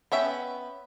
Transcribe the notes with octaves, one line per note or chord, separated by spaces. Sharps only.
B3 C#4 E5 G5